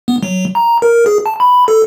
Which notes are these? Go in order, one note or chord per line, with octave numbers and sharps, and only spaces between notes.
B3
F#3
A#5
A#4
G#4
A5
B5
A4